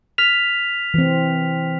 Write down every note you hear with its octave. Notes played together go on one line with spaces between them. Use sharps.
F6 B6 F7
E3 C4